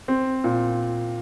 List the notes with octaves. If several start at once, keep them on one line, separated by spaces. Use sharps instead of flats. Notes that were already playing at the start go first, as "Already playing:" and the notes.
C4
A#2